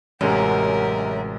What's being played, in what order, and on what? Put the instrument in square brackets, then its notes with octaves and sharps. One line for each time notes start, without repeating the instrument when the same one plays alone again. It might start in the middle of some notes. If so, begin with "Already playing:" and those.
[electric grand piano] A1 C3 G#3 [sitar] F#2 [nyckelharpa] G4 A#4